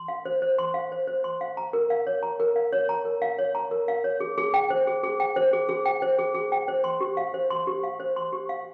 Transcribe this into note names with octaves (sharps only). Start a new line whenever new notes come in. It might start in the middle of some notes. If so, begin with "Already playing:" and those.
Already playing: C6
F5
C5
C5
C6
F5
C5
C5
C6
F5
A#5
A#4
F5
C#5
A#5
A#4
F5
C#5
A#5
A#4
F5
C#5
A#5
A#4
F5
C#5
G#4
G#4
G5
C5
G#4
G#4
G5
C5
G#4
G#4
G5
C5
G#4
G#4
G5
C5
C6
G4
F5
C5
C6
G4
F5
C5
C6
G4
F5